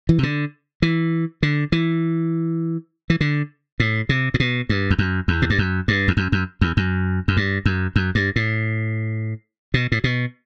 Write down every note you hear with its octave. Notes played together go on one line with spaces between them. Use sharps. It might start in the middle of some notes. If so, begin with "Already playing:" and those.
E3
C3
D3
E3
D3
E3
E3
D3
A2
C3
A2
B2
G2
E2
F#2
E2
A2
G2
F#2
G2
E2
F#2
F#2
E2
F#2
F#2
G2
F#2
F#2
G2
A2
B2
A2
B2